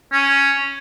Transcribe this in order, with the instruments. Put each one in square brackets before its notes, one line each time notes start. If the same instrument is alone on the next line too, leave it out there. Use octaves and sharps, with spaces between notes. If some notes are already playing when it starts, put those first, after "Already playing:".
[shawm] C#4